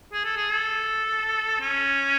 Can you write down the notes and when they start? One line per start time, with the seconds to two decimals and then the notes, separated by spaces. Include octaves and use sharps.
0.13 G#4
0.25 A4
0.37 G#4
0.50 A4
1.61 C#4